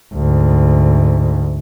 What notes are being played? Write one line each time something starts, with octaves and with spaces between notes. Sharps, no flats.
D2 G#2